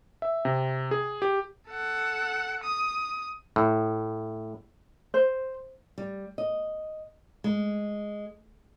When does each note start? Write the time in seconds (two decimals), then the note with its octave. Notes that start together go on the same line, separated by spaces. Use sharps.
0.22 E5
0.45 C3
0.91 G#4
1.22 G4
1.69 A4 F#5
2.64 D#6
3.56 A2
5.14 C5
5.98 G3
6.38 D#5
7.44 G#3